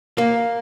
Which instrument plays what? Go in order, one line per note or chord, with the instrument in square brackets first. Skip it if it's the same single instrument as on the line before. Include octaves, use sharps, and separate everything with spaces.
[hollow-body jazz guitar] A#3